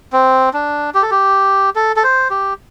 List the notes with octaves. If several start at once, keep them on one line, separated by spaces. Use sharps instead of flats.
C4
D4
G4
A4
G4
A4
A4
C5
G4